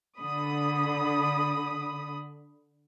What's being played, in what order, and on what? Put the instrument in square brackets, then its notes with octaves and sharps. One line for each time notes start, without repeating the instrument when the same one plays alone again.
[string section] D3 B5 D#6